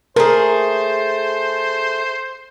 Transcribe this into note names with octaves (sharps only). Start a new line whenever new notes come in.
A3 G#4 A#4 C5